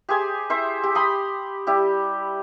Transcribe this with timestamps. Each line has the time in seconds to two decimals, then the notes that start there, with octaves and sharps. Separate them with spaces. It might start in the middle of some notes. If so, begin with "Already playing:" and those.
0.09 G4 G#4 C5 G#5
0.50 E4 C5 E5
0.83 G4
0.95 B5 C6 D#6
1.67 G3 E4 G4